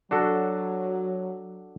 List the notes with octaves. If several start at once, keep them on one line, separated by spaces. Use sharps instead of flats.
F#3 D4 F#4 A4